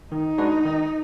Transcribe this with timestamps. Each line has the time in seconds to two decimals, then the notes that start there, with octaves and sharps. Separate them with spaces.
0.12 D#3 D#4
0.38 G#3 D4 F#4 B4
0.65 D#3